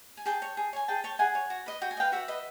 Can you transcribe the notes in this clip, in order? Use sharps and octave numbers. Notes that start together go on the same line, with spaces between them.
G#5
G#4 G5 A5
C#5
G#4
C#5 G#5
G#4 G5 A5
C#5 G5 A5
G#4 F#5 G#5
C#5
F#4
B4 D#5
F#4 G5
G#5
D#5
B4 F5 G5
F#4 E5 F#5
B4 D#5